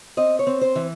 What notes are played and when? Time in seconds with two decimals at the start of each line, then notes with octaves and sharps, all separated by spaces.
0.17 C4 D#5
0.39 C#5
0.47 C4
0.61 C5
0.75 E3